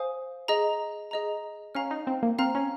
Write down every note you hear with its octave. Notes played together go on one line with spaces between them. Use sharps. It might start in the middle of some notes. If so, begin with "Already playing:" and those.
Already playing: C5 F5 G#5 D#6
G#4 D#5 A#5
G#4 D#5 A#5
C#4 F5 A#5 F6
D#4
C4
A#3
C4 F5 A#5 F6
C#4